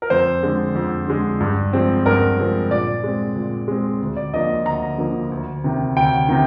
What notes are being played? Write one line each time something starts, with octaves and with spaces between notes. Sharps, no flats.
A#4
F2 C5
D3 G#3
F2
D3 G#3
G2
F3 G#3 C4
G2 A#4
F3 G#3 C4
A#2 D5
G#3 C4
A#2
G#3 C4
D2
D5
D3 F3 A#3 D#5
D2 A#5
D3 F3 A#3
D2
C3 D#3
D2 G5
C3 D#3